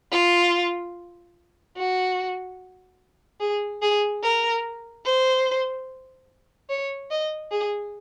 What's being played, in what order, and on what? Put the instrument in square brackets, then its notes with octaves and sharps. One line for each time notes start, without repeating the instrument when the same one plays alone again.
[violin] F4
F#4
G#4
G#4
A#4
C5
C#5
D#5
G#4